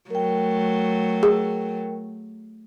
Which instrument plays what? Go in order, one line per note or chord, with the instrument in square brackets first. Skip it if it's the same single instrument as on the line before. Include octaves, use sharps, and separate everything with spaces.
[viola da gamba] F#3 A3 [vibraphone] A#4 G5
[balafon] G#4